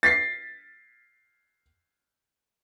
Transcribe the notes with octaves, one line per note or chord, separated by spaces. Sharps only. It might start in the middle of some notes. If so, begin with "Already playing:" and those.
A6 B6 C7